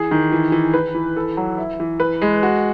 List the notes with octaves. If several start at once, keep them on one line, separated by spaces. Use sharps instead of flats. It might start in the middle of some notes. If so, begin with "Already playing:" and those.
Already playing: E3 G#4
D#3
E3
E3
B4
E3
A4
F#3
E4
E3
B4
G#3
F#4